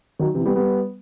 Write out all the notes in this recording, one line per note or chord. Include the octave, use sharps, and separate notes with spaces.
D#3 F#3
C3 E3
G3 B3
G3 B3